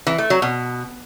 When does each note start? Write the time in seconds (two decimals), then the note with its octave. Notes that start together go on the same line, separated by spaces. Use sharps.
0.07 E3
0.18 A3
0.30 F#3
0.42 B2